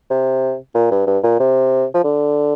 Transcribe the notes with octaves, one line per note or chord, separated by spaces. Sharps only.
C3
A#2
G2
G2
A#2
C3
F3
D3